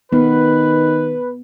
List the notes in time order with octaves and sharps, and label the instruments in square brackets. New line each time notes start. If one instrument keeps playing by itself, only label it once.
[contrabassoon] D#3 [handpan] B3 [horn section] B4